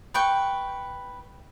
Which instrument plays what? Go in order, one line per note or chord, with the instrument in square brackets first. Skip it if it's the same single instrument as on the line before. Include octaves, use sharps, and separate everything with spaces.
[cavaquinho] B4 G5 C#6